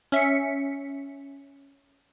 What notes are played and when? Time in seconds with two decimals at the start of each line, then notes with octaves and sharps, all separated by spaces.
0.12 C#4 E5 B6 C#7